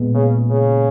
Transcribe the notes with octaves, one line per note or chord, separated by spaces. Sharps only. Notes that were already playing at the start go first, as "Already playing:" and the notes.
Already playing: A#2 G#3 B3
C#3
C#3